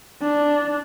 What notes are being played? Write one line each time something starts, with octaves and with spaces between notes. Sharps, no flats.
D4